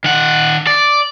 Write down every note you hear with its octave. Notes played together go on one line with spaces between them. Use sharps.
D#3 F#5
D5